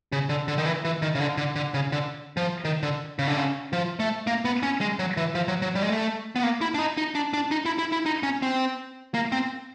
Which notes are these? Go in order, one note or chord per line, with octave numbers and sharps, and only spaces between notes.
C#3
D3
D3
D#3
E3
E3
D#3
C#3
D3
D3
D3
C#3
D3
F3
D#3
D3
C#3
D3
C#3
F3
A3
A#3
B3
C#4
G#3
F#3
E3
F3
F#3
F#3
G3
G#3
A3
B3
A#3
E4
D4
D#4
D#4
D4
D4
D#4
E4
E4
E4
D#4
C#4
C4
A#3
C4